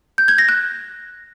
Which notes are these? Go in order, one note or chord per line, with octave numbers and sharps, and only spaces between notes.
G6
G#6
A#6
F#6